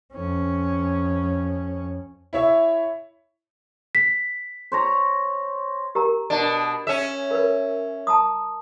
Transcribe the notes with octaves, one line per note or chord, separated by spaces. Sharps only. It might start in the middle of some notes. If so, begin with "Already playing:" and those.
F2 C#4
E4 C#5 E5
B6
C5 C#5 A#5
G4 A#4 A#5
B2 D4
C#4 E5
A#4 B4
A5 A#5 D#6